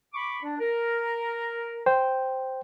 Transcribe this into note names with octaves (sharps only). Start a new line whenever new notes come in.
B5 C#6 D6
D4
A#4
C5 G5